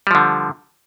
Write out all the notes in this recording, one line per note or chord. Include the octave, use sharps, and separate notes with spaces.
D3 F3 G3